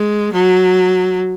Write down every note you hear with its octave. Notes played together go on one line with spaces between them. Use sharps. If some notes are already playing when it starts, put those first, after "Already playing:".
Already playing: G#3
F#3